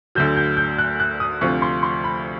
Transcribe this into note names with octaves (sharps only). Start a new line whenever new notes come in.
D2 D3 F#3 G6
G6
G6
F#6
F#6
D#6
D2 C3 F3 C#6
C6
C6
B5